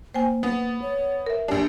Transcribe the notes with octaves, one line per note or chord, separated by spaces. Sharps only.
A#3 C5 G5 G#5
B3
C#5
A#4 E5
A#1 D4 G4